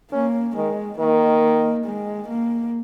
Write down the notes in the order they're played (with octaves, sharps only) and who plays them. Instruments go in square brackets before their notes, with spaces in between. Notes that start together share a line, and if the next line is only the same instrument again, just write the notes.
[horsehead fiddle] A#3 [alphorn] C#4
[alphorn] D#3 [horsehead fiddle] G#3
[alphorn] D#3 [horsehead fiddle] A#3
[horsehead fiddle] G#3
A#3